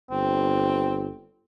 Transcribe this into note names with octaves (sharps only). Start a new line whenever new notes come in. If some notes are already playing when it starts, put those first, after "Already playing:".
G1 C4